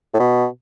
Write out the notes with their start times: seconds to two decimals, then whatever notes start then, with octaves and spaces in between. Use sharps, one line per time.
0.14 A2
0.19 B2